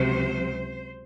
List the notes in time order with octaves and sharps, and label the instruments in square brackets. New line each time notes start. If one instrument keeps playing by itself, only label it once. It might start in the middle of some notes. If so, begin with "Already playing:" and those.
Already playing: [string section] C#2 C3 F#3 C5